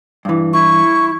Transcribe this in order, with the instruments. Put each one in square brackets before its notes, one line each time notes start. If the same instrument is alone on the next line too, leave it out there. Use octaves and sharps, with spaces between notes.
[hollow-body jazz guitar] G2 E3
[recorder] E4 [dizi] C#6